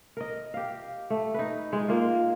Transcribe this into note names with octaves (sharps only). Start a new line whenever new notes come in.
A#4 D#5
G4 F5
A3
D#4 B4
G#3
A#3 F4